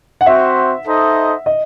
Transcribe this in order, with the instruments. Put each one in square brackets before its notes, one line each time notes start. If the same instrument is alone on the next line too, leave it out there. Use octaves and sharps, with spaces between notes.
[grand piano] F#5
[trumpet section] C4 F#4 C5 [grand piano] E5
[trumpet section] D#4 A4 C5 D#5
[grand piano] D#5